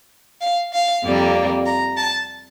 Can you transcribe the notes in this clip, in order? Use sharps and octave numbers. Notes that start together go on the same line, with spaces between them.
F5
F5
F2 C3 G3 A#3
A#5
A5